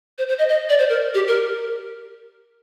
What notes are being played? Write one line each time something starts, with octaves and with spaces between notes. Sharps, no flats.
C5
C5
D#5
D#5
D5
C5
A#4
G4
A#4